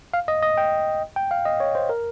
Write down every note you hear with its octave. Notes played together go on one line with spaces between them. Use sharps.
F5
D#5
D#5
G5
G5
F5
D#5
C#5
C5
A#4